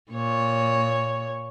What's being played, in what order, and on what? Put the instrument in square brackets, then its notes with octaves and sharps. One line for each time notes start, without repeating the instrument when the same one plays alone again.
[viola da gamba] A#2 C#5